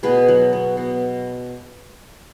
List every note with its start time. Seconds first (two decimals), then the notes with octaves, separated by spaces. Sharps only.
0.03 B2 G#4 B4
0.28 F#3
0.53 B3
0.77 B2